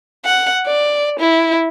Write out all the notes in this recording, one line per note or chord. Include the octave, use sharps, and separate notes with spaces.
F#5
D5
E4